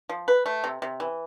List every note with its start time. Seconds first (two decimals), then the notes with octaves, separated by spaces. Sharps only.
0.09 F3
0.28 B4
0.46 A3
0.64 C3
0.82 C3
1.00 E3